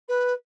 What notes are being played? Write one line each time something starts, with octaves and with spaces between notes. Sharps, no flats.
B4